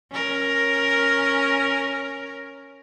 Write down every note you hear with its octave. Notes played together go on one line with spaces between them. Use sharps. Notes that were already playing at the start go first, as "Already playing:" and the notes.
C#4 A#4